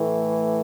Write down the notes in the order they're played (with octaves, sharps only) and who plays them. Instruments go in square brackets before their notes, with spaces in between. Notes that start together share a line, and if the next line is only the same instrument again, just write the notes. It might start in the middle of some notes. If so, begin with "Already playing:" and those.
Already playing: [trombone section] A2 E3 A3